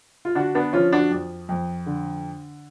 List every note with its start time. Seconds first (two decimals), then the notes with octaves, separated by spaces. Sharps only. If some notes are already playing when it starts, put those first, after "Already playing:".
0.25 F4
0.35 D3 D4 F#4
0.55 B3 D4
0.73 F3 C#4 F4
0.92 D4 F#4
1.11 F2
1.49 F2
1.86 D3